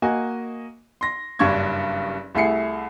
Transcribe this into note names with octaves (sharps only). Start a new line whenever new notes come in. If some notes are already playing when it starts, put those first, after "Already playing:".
A#3 F#4 D#5 G#5
C6 A#6
F#1 G2 D4 C#6 G#6
C2 A3 E4 G#4 C7 C#7